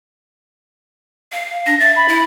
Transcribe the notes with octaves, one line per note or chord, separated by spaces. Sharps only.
F5
D4 A#6
E5 A6
B5
E4